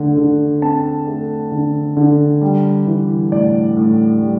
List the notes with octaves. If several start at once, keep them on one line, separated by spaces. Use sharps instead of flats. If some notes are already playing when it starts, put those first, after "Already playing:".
Already playing: D3 A3
D3
C4 A5
A3
D3
D3
G3
E3
A2 D5
A2
G3